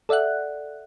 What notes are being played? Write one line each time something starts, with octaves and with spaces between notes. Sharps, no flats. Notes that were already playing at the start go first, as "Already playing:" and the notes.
A4 D5 E5 F#5 F#6